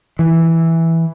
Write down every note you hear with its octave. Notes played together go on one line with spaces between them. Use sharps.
E3